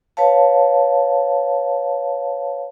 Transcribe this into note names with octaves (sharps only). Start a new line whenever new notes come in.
B4 C#5 F5 A5